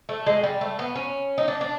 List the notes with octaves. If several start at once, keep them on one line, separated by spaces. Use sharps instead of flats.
A3
G#3
G3
A3
B3
C#4
D#4
D4
D4